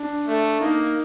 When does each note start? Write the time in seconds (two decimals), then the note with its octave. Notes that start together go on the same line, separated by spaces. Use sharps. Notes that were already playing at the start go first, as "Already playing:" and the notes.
Already playing: D4
0.27 A3
0.61 A#3 D#4